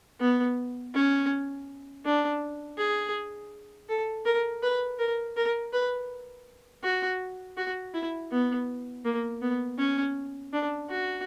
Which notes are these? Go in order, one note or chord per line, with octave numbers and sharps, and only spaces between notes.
B3
C#4
D4
G#4
A4
A#4
B4
A#4
A#4
B4
F#4
F#4
E4
B3
A#3
B3
C#4
D4
F#4